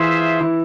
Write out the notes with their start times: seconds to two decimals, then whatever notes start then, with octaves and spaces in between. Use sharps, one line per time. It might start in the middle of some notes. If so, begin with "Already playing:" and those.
Already playing: E3 E4 F4 G#4 C5 E5
0.40 E3 E4